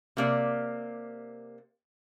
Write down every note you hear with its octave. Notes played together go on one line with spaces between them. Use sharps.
C3 A#3 D5